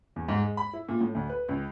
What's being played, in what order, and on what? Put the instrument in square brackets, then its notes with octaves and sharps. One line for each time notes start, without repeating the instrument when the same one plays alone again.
[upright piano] E2
G#2
G#3
B5
E4
A#2
A2
D2
B4
C#2